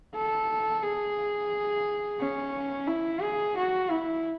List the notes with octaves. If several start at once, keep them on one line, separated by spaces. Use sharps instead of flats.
A4
G#4
C#4
E4
G#4
F#4
E4